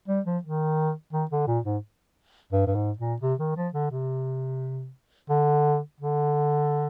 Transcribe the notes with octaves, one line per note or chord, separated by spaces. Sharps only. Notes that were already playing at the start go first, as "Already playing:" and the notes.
G3
F3
D#3
D#3
D3
A#2
G#2
G2
G2
G#2
A#2
C3
D#3
F3
D3
C3
D3
D3